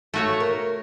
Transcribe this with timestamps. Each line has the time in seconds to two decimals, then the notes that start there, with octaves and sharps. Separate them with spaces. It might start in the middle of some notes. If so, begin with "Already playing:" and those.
0.14 A3 F#4 C#5
0.40 A#4